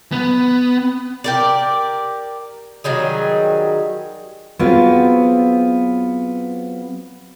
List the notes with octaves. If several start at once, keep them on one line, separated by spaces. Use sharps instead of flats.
B3
G4 A#4 D5
D#3 F#3 G3 G#4
F#3 B3 C4 F4 G#4